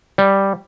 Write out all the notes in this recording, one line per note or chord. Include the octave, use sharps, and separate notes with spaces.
G3